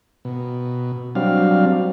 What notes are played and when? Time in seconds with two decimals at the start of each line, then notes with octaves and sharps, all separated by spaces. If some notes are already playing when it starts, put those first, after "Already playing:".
0.25 B2
1.15 F#3 G3 C4 D4 F5